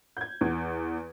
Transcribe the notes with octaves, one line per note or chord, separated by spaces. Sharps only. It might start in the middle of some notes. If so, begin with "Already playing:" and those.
G6 G#6
E2